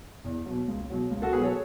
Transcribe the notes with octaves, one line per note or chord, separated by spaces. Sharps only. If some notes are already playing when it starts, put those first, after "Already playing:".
E2
B2 F#3
C#2
B2 F#3
C#2
F#4 A4
B2 F#3 G#4 B4
A4 C#5